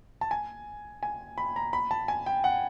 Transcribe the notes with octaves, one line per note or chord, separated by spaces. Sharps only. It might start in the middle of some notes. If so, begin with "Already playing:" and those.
A5
G#5
G#5
B5
A#5
B5
A5
G#5
G5
F#5